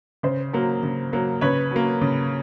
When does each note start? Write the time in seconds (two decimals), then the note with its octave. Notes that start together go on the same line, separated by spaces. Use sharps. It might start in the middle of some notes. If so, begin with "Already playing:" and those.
0.23 C#3 C5
0.53 F#3 A#3
0.83 C#3
1.13 F#3 A#3
1.41 C#3 B4 C#5
1.71 F#3 A#3
2.01 C#3